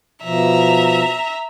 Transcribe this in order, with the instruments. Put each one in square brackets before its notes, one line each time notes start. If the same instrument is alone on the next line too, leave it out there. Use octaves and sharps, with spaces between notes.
[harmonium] B2 F3 [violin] E5 A#5